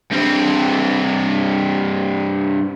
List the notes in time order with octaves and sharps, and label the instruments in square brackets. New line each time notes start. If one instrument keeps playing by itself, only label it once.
[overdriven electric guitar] G2 C4